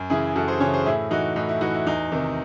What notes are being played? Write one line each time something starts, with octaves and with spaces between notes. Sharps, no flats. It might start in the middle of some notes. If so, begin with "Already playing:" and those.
Already playing: F#2
C#3 E3 E4 G#4
F#2 F#4 A4
G#4 C5
C#3 E3 A4 C#5
G#4 C5
A2 E4 G#4
E3 D#4 F#4
A2 D#4
E4
E3 D#4 F#4
E4
E2 D#4
C3 D#3